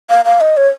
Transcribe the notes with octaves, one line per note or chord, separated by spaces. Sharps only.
F5
F5
D#5
C#5